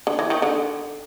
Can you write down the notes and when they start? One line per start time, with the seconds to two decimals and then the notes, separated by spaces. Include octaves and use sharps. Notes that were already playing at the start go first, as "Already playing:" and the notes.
0.07 D3
0.19 E3
0.30 D#3
0.42 D3